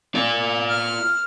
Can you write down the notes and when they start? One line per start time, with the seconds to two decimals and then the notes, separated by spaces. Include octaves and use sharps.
0.15 F4 D5
0.70 F6